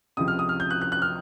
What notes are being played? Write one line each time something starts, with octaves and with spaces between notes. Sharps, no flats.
C#2 C3 F3 D#6
F6
D#6
F6
G6
F#6
F#6
F#6
F6